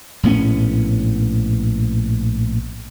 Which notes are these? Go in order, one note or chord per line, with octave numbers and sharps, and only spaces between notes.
A#1 A2 B3 C#4